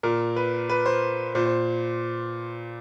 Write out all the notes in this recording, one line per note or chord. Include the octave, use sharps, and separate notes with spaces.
A#2 A#4
B4
B4
C5
A#2 C5
C5